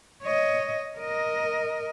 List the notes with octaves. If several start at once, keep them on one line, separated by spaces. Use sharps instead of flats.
C#5 D#5
A#4 D#5